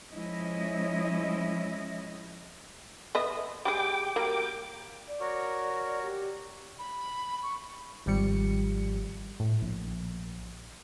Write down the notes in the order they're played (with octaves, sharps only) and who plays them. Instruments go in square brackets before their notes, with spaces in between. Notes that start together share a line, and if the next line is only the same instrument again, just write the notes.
[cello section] F3 G#3 C#4 E4 D#5
[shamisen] B3 D#5 E5
[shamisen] G3 G#3 G#4 [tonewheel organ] G5 D6
[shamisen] F#3 G3 A#3
[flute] D5
[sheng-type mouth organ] F#4 A#4 C#5
[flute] D5
G4
[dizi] B5
C#6
[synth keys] G#1 F3 G3 C#7
A2
A#1